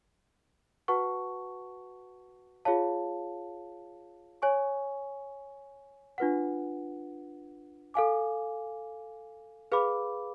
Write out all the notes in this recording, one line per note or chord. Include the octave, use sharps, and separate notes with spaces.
F#4 B4 F#5 A5 C#6
F4 G#4 C#5 F5 A5
C#5 G#5 C#6
D4 F4 B4 F#5
A4 F5 G#5 D6
G#4 B4 F5 B5 D6